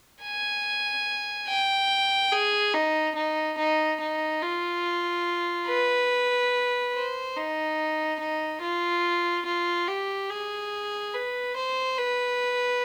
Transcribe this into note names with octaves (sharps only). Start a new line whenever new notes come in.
G#5
G5
G#4
D#4
D#4
D#4
D#4
F4
B4
C5
D#4
D#4
F4
F4
G4
G#4
B4
C5
B4